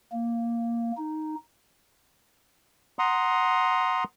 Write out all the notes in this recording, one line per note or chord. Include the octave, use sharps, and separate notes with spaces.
A#3
D#4
F#5 A#5 C6 D#6